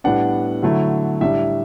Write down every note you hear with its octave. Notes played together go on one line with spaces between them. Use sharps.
A2 G3 B3 D4 F#5
D3 F#3 A3 E4
A2 G3 D4 E5